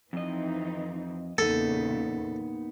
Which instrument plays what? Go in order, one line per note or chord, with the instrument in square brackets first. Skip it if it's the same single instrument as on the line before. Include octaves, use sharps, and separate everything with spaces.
[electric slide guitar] F2 D#5 [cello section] E3 C4 D#4
[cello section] E2 A#2 C#3 [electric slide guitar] A#3 B3 D#4 [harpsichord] A4